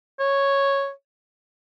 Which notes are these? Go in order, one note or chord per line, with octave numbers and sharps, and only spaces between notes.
C#5